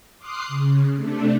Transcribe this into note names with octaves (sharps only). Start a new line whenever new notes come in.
C6 D6 D#6 F6 F#6 C7
C#3
C3 A3 D4